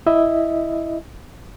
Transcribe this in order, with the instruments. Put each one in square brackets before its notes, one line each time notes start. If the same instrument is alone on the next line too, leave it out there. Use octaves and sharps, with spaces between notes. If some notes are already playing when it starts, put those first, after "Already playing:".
[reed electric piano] E4 D#5 E5